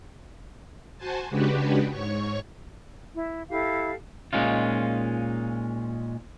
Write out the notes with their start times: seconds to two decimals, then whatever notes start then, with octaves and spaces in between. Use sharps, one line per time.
0.98 F#4 C5 G#5 A5
1.30 C#3 G#3 D4 F#4 G4 B4
1.91 G#2 C#5 C#6
3.15 E4
3.50 E4 G4 A4 F5
4.33 A#2 G#3 C#4 D#4 F4